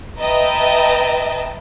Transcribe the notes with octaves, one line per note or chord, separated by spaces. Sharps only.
B4 D#5 E5 G5 A5 A#5